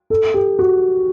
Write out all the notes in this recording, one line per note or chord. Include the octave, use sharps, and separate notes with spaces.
A4
G4
F#4